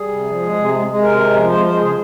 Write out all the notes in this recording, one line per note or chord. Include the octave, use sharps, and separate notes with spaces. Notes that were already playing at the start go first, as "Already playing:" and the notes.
Already playing: G3 G#4
C3
F3
G#3
C3
G#3
G#3
C3 A#4
G#3
F3
G#3 C5
G#3 C5
C#3 G#4